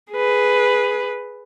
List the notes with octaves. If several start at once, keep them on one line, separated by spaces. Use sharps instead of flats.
G#4 B4